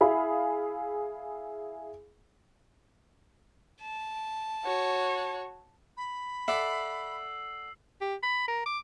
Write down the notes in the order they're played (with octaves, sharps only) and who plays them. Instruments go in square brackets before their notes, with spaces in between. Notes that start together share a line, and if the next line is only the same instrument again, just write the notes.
[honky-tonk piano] E4 G#4 F5 B5
[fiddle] A5
[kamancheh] F#4 C#5
[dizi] B5
[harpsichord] A4 D5 F#5 [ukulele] E5 [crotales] E6 C7 F#7
[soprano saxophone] G4
B5
A#4
D6